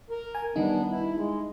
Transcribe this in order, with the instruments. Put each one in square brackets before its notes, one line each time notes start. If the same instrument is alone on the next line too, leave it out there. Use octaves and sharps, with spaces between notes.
[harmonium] A#4
[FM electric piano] G#5
[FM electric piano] D#3 G3 D#4 [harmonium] B3 D4
[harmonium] E4
G#3